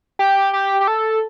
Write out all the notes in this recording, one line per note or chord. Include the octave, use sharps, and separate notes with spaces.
G4
G4
G4
A4